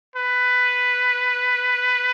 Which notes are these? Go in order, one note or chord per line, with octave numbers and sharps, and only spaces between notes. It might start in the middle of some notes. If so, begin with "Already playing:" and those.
B4